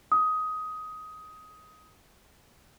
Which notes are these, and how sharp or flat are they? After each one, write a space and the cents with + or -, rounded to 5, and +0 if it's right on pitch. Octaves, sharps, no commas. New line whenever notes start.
D#6 +15